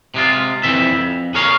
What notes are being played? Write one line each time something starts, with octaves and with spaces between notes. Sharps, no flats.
C3 G#3 F4
F2 E3 C4 E5
F2
G#4 A#4 C#5 F5